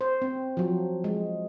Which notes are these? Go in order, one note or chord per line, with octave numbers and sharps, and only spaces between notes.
C5
C4
F3 F#3
G#3